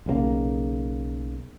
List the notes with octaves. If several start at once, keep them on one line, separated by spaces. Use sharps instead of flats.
B1 C#3 F3 A#3